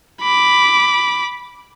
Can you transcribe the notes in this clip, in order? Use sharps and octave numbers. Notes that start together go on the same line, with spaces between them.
B5 D6